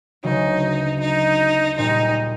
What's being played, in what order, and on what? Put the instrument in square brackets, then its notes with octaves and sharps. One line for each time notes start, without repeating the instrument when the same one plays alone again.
[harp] D2 C#3 F#3 B3 [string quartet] D#4
[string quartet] D#4
[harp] A#1 A#2 G3 [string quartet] D#4